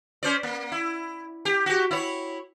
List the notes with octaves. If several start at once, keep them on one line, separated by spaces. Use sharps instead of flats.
C#4 C5 D5
A#3
E4
G4
F#4 G4
E4 C#5